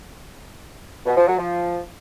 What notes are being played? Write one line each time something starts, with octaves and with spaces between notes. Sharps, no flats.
B2
F3
F#3
F3